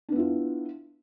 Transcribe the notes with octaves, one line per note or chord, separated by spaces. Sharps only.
B3 D4 E4 F4